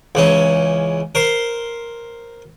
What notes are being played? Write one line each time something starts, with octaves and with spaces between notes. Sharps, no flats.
C#2 E3 C#4
A#4 C5 C6